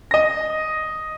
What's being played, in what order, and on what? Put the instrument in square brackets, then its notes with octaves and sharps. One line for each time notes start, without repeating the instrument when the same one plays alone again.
[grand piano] D#5 A#6